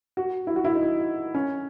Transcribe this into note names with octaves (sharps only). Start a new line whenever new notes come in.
F#4
E4
F#4
E4
D#4
C#4